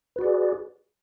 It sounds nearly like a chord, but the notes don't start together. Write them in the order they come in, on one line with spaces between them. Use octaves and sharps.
B4 F#4 D5 G#4